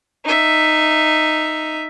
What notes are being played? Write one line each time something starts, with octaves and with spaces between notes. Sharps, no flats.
D#4 E5